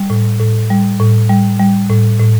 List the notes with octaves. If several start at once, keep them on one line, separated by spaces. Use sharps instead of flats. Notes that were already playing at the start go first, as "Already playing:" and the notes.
Already playing: G3
A2
A2
G3
A2
G3
G3
A2
A2